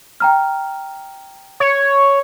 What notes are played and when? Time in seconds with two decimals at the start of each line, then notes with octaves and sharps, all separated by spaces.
0.20 G5 A#5 F6
1.60 C#5